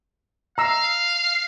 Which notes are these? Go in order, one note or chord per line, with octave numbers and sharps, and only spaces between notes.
F5 A#5 E6